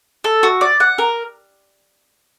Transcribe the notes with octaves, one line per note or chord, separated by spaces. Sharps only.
A4
F#4
D5
F#5
A#4